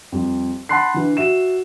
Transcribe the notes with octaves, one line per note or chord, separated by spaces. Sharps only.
F2 G3
F#5 A5 B5 C6 F#6 C7
D3 E3
F#4 E5 E7